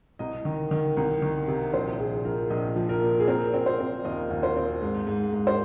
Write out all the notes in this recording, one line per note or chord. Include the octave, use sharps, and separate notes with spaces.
C2 D#5
D#3
D#3
C2
D#3
C3
A#1 C5
A#1 G#4
F3 A#4
A#1 D#5
F3
A#4
A#2
G#4
C4 A#4
C4
C5
C4
D#2 D#5
D#2
C5
C4
G#2
G#2
G#2
C5